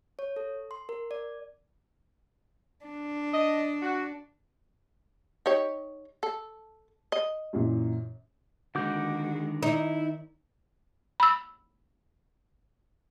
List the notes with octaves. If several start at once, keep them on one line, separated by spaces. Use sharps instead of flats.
C#5
A4
C6
A#4
D5
D4
D#5
F#4
D#4 G4 C#5
A4
D#5
F#2 A#2 E3
D3 D#3 G#3 F#4 D6 G6
D#4 E4
B5 E6